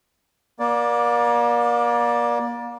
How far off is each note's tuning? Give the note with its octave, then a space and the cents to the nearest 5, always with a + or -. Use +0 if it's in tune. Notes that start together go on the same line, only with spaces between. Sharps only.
A#3 +35 D5 +0